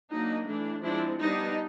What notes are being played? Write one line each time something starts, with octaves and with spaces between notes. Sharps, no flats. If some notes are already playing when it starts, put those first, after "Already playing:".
F#3 A#3 D4 D#4
E3 A3 D4
F3 G#3 C4 D4 E4
G3 B3 D4 D#4